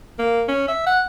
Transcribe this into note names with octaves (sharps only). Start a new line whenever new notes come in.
A#3
C#4
E5
F#5